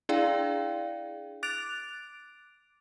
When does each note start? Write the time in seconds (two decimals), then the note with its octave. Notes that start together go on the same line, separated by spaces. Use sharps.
0.09 D4 E4 G#4 D5 F5 G5
1.43 D6 F#6 A6 D7 F7